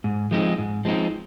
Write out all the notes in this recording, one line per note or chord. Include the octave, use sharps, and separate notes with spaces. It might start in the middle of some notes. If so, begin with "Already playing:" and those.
G#2
F3 G#3 C4 D#4
G#2
F3 G#3 C4 D#4